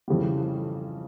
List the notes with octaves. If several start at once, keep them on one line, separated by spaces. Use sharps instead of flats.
F2 C#3 E3 G3